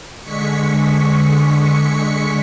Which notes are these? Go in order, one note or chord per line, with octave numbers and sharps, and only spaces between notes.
D3 G#3 C#6 B6 C#7